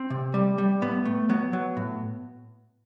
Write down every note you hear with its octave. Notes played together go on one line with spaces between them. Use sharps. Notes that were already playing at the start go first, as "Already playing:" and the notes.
Already playing: C4
C3
G3
G3
A2 B3
A3
F#3 B3
F#3
A2